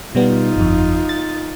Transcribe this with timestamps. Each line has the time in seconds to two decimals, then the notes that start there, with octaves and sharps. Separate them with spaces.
0.15 B2 G3 B3 D#4 F4
0.56 G1 F2
1.09 A6